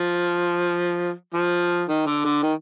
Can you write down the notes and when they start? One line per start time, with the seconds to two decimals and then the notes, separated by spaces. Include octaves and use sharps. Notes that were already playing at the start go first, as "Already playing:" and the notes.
Already playing: F3
1.34 F3
1.89 D#3
2.06 D3
2.25 D3
2.43 D#3